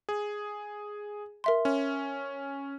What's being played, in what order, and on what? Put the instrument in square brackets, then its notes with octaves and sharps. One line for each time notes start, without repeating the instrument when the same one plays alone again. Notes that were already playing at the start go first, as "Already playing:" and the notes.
[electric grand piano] G#4
[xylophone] A#4 E5 C6
[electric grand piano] C#4